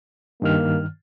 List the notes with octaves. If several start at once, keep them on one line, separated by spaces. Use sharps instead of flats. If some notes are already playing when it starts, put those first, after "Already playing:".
G2 D#3 A#3 F6